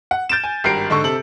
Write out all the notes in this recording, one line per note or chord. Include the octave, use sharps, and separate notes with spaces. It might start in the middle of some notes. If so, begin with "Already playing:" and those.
F#5
G6 A6 D7 E7
G#5
G#1 G2 G4 A#4 C7 D7
G#2 D3 A4 C#6
C3 A4 F#7